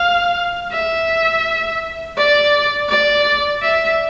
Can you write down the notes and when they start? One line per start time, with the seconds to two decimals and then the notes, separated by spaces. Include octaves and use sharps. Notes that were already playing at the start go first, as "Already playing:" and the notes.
Already playing: F5
0.71 E5
2.17 D5
2.89 D5
3.62 E5